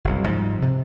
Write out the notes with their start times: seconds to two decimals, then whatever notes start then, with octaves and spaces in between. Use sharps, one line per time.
0.05 F#1 C2
0.28 G#2 F3 G3
0.62 C3